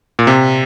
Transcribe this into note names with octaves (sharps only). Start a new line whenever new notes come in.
A#2
C3